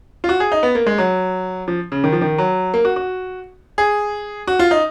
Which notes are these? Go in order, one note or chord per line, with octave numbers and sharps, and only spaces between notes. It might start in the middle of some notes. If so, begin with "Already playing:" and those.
F4
F#4
G#4
D#4
B3
A#3
G#3
F#3
F3
C#3
D#3
F3
D#3
F#3
A#3
F#4
F#4
G#4
F#4
F4
D#4